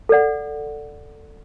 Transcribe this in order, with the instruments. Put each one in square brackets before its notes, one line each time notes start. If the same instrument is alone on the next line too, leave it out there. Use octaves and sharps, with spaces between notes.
[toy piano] A4 D5 F#5